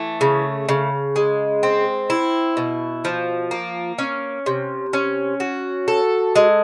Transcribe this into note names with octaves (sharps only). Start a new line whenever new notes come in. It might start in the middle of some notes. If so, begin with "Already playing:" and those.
Already playing: E3 A3
C#3
C#3
G#3
C4
E4
B2
F3
A#3
C#4
C3
C#4
F#4
A4
G#3